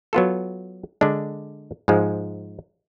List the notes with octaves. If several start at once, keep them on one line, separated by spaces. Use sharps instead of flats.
F#3 B3 F4 A4
D3 G#3 D4
G#2 F3 G#3